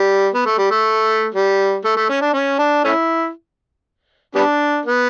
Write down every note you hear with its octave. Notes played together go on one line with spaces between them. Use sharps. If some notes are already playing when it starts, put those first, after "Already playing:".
Already playing: G3
B3
A3
G3
A3
G3
A3
A3
C#4
D4
C#4
D4
A3 C#4 E4
G3 B3 D4
B3